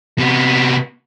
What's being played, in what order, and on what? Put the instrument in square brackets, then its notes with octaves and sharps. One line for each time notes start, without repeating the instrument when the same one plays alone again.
[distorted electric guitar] C3 B3